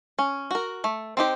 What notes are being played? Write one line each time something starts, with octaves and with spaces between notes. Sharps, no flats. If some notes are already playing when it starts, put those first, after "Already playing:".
C#4
F#4 A#4
A3
C4 D#4 G4 C5